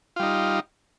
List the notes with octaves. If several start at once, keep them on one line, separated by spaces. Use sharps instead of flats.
G3 D#4 F4